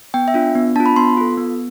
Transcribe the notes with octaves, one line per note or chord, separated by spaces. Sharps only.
B3 G5
E5
D4 F4
B3
D4 F4 A5
B5
B3 C6
F4 A4
B3